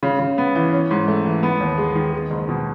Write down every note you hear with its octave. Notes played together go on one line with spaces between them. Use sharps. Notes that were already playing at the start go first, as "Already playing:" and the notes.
C#3
C#3
B3
E3
C#4
G#2
A3
E3
B3
D#2
G#3
D#3
G#3
F#1
B2